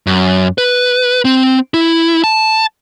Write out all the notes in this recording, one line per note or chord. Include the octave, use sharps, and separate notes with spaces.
F#2
B4
C4
E4
A5